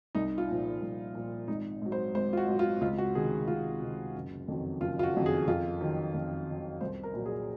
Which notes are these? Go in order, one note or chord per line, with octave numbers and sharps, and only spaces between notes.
C2 D#4
F4
A#2 F3
C2
A#2 F3
G#1 D#4
G#2 F#3
C5
G#1 C5
F4
F#4
G#2 F#3
F4
C#2 F4
F#4
C3 D#3 G#4
C#2 F4
C3 D#3
F#1
F2 D#3 F#3
F#1 F4
F4
F#4
F2 D#3 F#3
G#4
F2 F4
D#3 F#3
F2
D#3 F#3
C2 C5
A#4
A#2 F#3
G#4